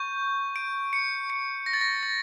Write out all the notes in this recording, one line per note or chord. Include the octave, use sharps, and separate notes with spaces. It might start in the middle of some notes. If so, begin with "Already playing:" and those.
Already playing: C#6 G6
D7
C#7
C#7
A#6
A6
A#6
A6